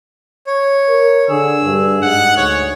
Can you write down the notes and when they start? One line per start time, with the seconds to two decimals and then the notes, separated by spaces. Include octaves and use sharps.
0.47 C#5
0.89 A#4
1.29 D3 G#4 E6
1.63 G2
2.02 G#2 F#5
2.37 D2 C#5